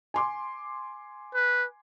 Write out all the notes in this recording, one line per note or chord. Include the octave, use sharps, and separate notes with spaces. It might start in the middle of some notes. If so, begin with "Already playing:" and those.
G#5 C6 D6
B4